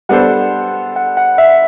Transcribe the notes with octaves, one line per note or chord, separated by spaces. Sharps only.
G3 B3 D4 A4 C5 F#5
F#5
F#5
E5